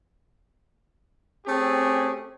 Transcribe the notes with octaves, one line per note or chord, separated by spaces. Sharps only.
A3 C4 C#4 G4 G#4